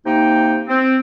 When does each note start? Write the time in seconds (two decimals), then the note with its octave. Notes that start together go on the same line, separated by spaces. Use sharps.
0.06 C3 A#3 D#4 G5
0.69 C4